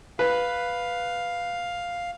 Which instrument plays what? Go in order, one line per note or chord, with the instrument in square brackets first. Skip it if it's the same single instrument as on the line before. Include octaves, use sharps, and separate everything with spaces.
[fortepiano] B4 [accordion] F5